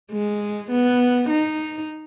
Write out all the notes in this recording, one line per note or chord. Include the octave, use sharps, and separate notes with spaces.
G#3
B3
D#4